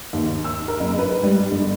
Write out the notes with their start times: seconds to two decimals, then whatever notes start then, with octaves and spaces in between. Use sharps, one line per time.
0.13 D#2
0.44 E6
0.68 A#4
0.80 F#1
0.99 B4
1.23 G3
1.51 G1